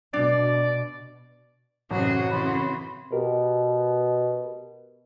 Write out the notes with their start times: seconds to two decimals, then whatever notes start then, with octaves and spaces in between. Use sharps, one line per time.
0.14 B2 D4 D5
1.91 A1 F#2 C3 F#4 G#4
2.29 C#3 E3 C4 B5 C6
3.12 B2 G4 A#4